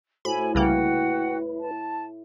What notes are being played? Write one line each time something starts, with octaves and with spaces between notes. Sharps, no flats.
A2 E4 F#4 A4 C5 G#5 B5
C2 C#3 A#3 E4 F#4 B4 F#5 G5
A5